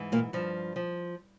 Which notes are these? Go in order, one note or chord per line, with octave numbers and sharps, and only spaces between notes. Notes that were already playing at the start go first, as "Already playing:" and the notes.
Already playing: G#2 E3
A#2 A#3
G2 F3
F3